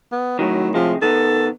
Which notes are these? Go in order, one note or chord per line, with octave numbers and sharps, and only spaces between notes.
B3
A2 D#3 F#3
A2 C3 F3 G#3
D#3 B3 A4